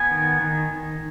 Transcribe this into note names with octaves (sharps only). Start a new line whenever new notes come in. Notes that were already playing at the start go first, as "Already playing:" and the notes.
Already playing: B3 G#5
D#3
D#3